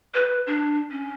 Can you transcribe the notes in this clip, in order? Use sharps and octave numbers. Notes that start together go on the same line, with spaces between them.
B4
D4
C#4